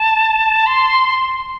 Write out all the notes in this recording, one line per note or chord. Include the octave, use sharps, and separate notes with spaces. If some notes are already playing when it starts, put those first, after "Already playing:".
Already playing: A5
C6